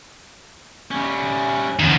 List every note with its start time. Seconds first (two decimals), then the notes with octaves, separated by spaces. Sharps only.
0.91 G3 C#4
1.79 D#3 F3 B3 C#4